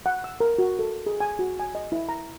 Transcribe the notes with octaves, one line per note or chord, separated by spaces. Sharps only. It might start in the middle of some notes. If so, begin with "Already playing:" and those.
F#5
E6
A#4
F#4
A4
G#4
G#5
F#4
G#5
D#5
E4
A#5